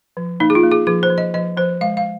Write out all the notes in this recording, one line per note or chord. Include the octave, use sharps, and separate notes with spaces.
F3
A#3 D#4
G#4
F4
A#3
G#4
F3 G#4
C5
F3
D#5
F3 D#5
F3 C5
G#3 F5
F5